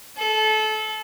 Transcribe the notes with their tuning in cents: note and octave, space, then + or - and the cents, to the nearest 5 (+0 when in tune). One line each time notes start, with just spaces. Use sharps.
A4 -25